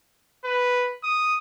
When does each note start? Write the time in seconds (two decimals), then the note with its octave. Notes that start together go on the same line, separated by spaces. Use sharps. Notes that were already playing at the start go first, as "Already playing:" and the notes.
0.45 B4
1.04 D#6